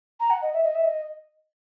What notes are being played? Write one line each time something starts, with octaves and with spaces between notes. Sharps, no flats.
A#5
F#5
D#5
E5
D#5
E5
D#5